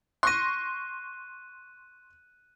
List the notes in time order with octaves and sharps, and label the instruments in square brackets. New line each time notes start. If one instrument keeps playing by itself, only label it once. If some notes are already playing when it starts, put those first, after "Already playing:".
[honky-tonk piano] C6 C#6 A#6 [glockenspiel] F#6 D#7